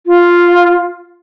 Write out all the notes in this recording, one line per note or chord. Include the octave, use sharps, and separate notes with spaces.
F4